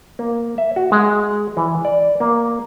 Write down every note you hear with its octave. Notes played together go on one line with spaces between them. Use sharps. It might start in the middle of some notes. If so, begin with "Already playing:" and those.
A#3
E5
F#4
G#3
E3
D5
A#3